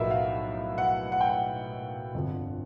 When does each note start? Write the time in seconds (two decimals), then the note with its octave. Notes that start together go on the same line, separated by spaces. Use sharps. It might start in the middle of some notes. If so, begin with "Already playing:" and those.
Already playing: B1 A2 F3 F#4 A#4 B4 E5
0.11 F5
0.78 F#5
1.12 F#5
1.21 G5
1.29 F#5
2.14 G1 F2 D3 F3